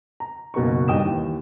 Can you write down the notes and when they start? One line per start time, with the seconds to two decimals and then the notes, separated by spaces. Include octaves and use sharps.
0.20 A#5
0.54 F#1 B2 A#3 D#4 C#6
0.88 G1 G2 D#4 G5 D#6 E7
1.03 D#2 E3